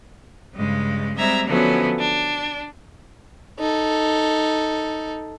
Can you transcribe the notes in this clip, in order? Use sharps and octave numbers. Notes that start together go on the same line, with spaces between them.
G2 C#3 G#3
G3 G#3 C4 E5 A#5 G#6
D3 F3 F#3 A3 B3 C#4
D4
D#4 A4